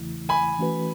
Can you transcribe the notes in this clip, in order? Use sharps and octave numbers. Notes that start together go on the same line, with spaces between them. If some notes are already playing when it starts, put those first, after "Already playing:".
Already playing: E2 C#3 E3 A3 E4
G#5 B5
E3 A3 C#4 F#4 B4